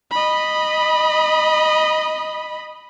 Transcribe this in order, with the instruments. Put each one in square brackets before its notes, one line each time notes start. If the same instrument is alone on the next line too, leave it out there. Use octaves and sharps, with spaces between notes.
[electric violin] D#5 B5